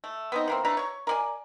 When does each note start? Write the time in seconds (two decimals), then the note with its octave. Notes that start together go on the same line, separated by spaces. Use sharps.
0.04 A3
0.32 B3 C4 D#4
0.48 E3 A#3 C4
0.65 A3 D4 B4 A#5
0.77 C#5 C#6
1.07 A#4 D5 G#5